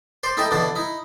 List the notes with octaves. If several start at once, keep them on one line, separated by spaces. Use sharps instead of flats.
C5 D5 C6
D#4 E4 A4 D#5 E5 G5
E2 B2 D3 D4 E4 A4
D#4 E4